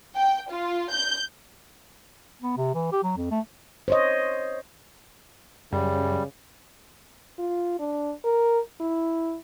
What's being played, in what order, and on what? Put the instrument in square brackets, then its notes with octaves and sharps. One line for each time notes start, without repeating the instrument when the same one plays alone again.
[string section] G5
F4
G6
[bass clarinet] B3
C3
E3
G4
F#3
F2
A3
[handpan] C5 C#5 D#5
[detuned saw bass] F#2 [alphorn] C#3 [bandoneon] G3
[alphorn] F4
D4
A#4
E4